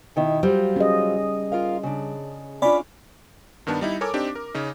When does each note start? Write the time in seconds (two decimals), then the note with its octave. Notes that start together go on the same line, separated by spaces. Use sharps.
0.16 B2 D#3 E4
0.43 F#3 G3 F4 C5
0.76 C#4 G#4 D#5
1.52 F4 A#4 F5
1.83 C#3 D4
2.62 C#4 D4 F4 D5 B5
3.67 G2 D#3 B3 D4 A5
3.81 G3 D#4 E4
4.01 A4 A#4 C#5 G#5 D6
4.14 C4 D4 D#4 G4
4.35 A#4
4.54 C#3 C#4 D#4